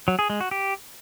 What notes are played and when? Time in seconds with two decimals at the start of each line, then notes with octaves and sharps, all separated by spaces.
0.08 F#3
0.19 G#4
0.30 G#3
0.41 F#4
0.51 G4